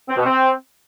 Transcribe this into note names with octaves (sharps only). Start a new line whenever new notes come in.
C4
B2
C4